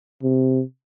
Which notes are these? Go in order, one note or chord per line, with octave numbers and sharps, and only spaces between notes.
C3